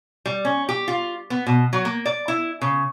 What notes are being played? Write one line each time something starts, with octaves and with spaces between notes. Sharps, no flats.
G3
C#4
G4
F4
B3
B2
F#3
A#3
D5
E4
C#3